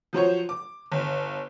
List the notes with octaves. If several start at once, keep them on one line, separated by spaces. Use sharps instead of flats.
F3 F#3 C5 C#5
D6
G1